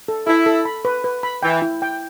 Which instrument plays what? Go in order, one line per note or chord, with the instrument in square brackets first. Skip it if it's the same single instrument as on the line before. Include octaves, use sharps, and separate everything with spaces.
[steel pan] A4
[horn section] E4 [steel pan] A4
[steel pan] A4
B5
B4
B4
B5
[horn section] E3 [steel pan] G5
[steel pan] E4
G5